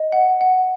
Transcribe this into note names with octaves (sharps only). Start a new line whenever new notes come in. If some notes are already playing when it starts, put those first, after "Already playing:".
Already playing: D#5
F#5
F#5